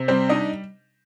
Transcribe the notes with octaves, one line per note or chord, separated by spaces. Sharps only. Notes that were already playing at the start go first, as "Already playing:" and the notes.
Already playing: C3
G3 C4 C5
D4 D#4 D#5